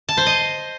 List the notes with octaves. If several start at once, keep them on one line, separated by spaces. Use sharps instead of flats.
A5
C5
D#5